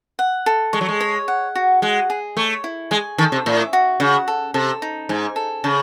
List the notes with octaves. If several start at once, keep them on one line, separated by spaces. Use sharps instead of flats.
F#5
A4
G#3 C#6
F#3
G#3
C#5
F#5
F#4
G#3 F#5
G#4
A3 C#5
E4
G#3 G#5
D#3 A4
C3
A2 E5
F#4
C#3 F#5
A4
C3 A4
D#4
G#2 G#5
A4
C#3 A5